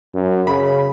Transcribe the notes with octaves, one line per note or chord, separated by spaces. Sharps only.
F#2
C#3 B5